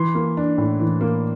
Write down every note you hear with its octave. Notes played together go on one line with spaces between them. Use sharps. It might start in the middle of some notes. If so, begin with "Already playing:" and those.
Already playing: E3 C6
A#3
D4
A2
E3
A#3